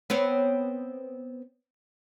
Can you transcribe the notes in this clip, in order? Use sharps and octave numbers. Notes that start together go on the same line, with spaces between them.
B3 C4 C#5